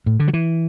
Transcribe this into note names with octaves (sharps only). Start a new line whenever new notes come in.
A2
D3
F#3
E3